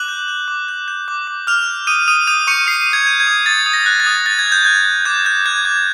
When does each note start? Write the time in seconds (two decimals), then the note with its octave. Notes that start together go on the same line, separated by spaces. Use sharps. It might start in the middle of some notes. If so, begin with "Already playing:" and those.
Already playing: D6 F#6 F#7
0.08 G6
0.28 G6
0.48 D6
0.68 G6
0.88 G6
1.08 D6
1.27 D6
1.47 D6 F6 F7
1.67 G6
1.87 D#6 G6 D#7
2.08 D#6 D#7
2.27 D#6 G6 D#7
2.47 C#6 G6 C#7
2.67 D#6 C7
2.87 D#6
2.93 G#6
3.07 G6
3.20 G#6
3.27 D#6
3.46 D#6 A6
3.66 D#6
3.73 A#6
3.86 F#6
4.00 A6
4.06 D#6
4.26 F#6 A6
4.39 G#6
4.46 F#6
4.52 G6
4.65 F#6 G#6
4.85 F#6
5.05 D6 G6
5.25 F#6 G6
5.46 F#6 G#6
5.65 D6 G#6